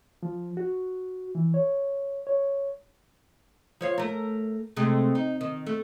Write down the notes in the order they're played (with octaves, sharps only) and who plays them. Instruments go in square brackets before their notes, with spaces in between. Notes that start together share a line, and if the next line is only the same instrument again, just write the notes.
[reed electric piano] F3
F#4
E3
C#5
C#5
[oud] F3 C#5 F5
A3 A#4
C3 G#3 A3
D#4
D#3
A3